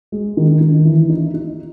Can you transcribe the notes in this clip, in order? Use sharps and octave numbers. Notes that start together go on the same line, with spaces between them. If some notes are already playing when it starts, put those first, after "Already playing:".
G#3
D#3
D#3
E3
D#4
D#4